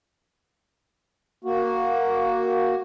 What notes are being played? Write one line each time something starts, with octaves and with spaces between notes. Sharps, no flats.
A#3 F#4